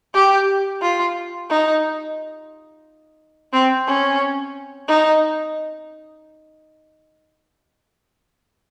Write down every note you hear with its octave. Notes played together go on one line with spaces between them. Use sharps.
G4
F4
D#4
C4
C#4
D#4